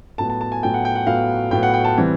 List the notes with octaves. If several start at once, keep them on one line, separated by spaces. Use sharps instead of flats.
A2 F#3 B3 A5
A5
A5
G#5
A2 F#3 B3 G5
F#5
G5
F#5
A2 F#3 B3 F5
A2 F#3 B3 G5
F#5
G5
A5
C3 E3 G3 C4